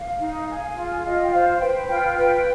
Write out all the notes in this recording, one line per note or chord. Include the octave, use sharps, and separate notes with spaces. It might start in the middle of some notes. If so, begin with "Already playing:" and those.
Already playing: F5
D#4
G#4
F4
F4 D#5
G5
C5 F5
B4 G5
F4 G5
B4 G5